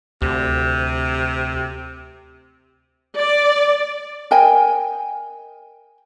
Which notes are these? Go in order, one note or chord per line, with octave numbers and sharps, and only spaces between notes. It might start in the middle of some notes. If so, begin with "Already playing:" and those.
D2 C3
D5
A#4 D#5 G5 G#5